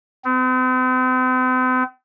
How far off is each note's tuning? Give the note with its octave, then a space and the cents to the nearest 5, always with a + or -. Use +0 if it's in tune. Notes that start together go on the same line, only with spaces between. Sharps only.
C4 -45